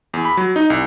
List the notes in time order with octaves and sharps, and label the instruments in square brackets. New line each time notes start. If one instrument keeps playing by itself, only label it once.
[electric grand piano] E2
B5
F#3
D#4
C2